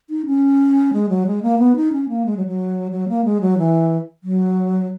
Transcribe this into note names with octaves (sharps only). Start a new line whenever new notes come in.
D#4
C#4
G#3
F#3
G#3
A#3
B3
D#4
C#4
A#3
G#3
F#3
F#3
F#3
A#3
G#3
F#3
E3
F#3